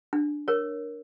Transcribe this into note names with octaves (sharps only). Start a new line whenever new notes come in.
D4
A#4 C#5